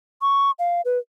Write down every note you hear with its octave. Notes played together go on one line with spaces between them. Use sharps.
C#6
F5
B4